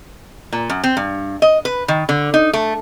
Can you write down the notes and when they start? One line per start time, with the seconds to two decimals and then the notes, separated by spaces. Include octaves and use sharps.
0.53 A#2
0.70 F#2
0.84 C4
0.97 G2
1.42 D#5
1.65 B4
1.88 D#3
2.09 D3
2.34 D#4
2.53 A3